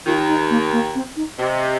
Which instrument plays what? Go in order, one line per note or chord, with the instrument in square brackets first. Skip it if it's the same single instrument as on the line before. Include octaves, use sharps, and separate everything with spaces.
[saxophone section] D#2 D#3 [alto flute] F4
[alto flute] D#4
A#3
A#3
C4
D#4
[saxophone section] C3 [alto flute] D#5